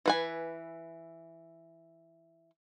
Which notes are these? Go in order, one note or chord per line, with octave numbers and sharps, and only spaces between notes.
E3 B4 G#5